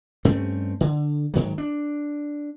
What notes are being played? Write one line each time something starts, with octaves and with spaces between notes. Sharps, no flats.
G2 A3 C4 C#4
D3
G#2 D#3 F#3
D4